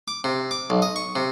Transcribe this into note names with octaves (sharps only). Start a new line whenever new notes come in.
D6
C3
D6
B1
D#5
C#6
C3